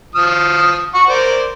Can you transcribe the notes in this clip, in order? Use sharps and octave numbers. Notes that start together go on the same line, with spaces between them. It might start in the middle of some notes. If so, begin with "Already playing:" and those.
F3 D#6 F6
F#5 C#6
A#4 C5 D5